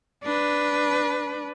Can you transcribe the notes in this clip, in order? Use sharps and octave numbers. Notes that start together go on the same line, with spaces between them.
D4 B4